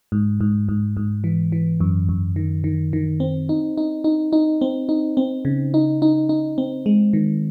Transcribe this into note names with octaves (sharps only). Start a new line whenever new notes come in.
G#2
G#2
G#2
G#2
E3
E3
F#2
F#2
D#3
D#3
D#3
C4
D#4
D#4
D#4
D#4
C4
D#4
C4
C#3
D#4
D#4
D#4
C4
G#3
D#3